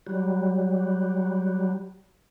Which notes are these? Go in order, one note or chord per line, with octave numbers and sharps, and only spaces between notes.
F#3 G3